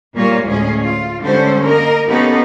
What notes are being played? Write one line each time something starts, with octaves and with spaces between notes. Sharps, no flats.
A#2 G3 A#3 F4 C#5
D2 A2 G#3 C#4 G#4
F4
D3 G3 G#3 C#4 A4 C5
A#3 A#4 D#5
A#3 B3 C#4 D#4 G4 A4